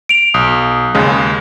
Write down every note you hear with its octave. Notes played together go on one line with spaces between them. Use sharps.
D7 F7
B1 D#6
D#2 C#3 G#3